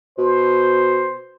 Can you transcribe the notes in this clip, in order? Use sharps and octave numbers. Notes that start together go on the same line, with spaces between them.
B2 C5